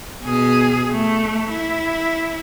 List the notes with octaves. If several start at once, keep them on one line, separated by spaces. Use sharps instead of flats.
B2 G#4
A3
E4